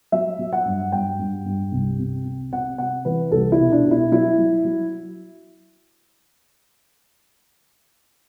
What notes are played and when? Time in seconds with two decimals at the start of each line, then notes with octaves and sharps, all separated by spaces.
0.12 F#3 E5
0.39 F#3
0.53 F#5
0.65 G2
0.92 G2 G5
1.19 G2
1.46 G2
1.72 C2
1.99 C3
2.25 C3
2.52 C3 F#5
2.78 C3 F#5
3.05 E3 B4
3.31 C2 A4
3.52 E4
3.59 B2
3.72 D4
3.85 B2
3.91 E4
4.12 F#3 E4
4.38 F#3
4.65 F#3